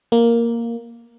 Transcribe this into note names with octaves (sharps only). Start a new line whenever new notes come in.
A#3